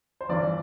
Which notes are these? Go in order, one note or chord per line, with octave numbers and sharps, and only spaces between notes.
C5
G1 G2 E3 D5